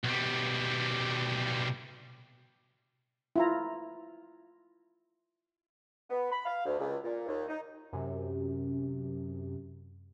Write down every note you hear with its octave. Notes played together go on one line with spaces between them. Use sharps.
B1 G3
E4 F4 A#5
B3
B5
F5
D2
C#2
A#2
D#2
D#4
F#2 C3